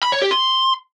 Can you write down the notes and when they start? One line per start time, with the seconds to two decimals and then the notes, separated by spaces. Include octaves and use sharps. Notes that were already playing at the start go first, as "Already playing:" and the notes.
0.03 B5
0.12 C#5
0.22 G4
0.31 C6